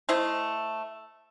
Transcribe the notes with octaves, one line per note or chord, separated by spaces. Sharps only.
A3 E4 C5 D#5